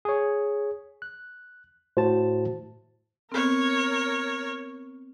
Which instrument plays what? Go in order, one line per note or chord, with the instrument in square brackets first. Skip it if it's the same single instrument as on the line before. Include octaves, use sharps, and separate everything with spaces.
[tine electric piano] G#4 C#5
F#6
[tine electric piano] A2 A5 [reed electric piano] F#4 C5
[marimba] B3 C4 [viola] A#4 C#5